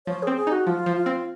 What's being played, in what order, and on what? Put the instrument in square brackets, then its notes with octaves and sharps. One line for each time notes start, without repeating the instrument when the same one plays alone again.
[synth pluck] F3 [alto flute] C#5
[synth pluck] C4 [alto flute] G#4
[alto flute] G#4
[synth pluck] D#4 [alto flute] F#4
[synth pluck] F3 [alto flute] F4
[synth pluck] F3
[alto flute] F4
[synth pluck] C4